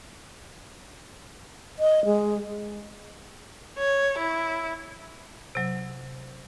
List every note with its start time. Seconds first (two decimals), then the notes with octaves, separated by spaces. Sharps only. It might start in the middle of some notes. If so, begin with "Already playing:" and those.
1.79 D#5
2.06 G#3
3.78 C#5
4.18 E4
5.55 C3 F#3